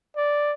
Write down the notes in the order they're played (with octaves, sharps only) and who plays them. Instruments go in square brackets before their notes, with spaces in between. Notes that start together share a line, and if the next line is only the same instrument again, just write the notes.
[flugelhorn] D5